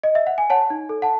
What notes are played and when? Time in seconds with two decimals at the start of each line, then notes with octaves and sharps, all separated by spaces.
0.03 D#5
0.15 E5
0.27 F#5
0.38 G#5
0.50 C#5 F#5 A5
0.70 D#4
0.89 A4
1.02 F#5 A5